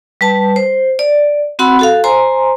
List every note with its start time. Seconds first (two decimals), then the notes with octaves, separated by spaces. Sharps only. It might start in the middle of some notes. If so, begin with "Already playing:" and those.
0.21 G3 B4 A5
0.56 C5
0.99 D5
1.59 C4 F#4 F#5 B5 C6 E6
1.79 F#4 A4 F5
2.04 C5 G#5 A#5 C6